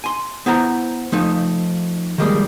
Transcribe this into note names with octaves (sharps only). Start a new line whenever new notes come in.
G#5 C6
B3 E4 C5 A#5
F3 A3 D#4
D#3 F3 G3 G#3 A#3